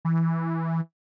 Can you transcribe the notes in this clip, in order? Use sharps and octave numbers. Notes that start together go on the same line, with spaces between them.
E3